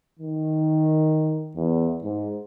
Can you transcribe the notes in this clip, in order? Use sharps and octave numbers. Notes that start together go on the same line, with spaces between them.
D#3
E2
G#2